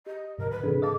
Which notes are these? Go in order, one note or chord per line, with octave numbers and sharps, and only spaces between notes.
G4 D#5
G#2 C3 F3 A#4
G#2 D3 A3 B4
C3 E3 D4 G#4 A4
D#5 F5 A5 D6